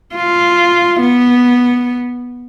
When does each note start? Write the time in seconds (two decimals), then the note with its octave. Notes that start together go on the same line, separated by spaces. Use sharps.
0.15 F4
1.01 B3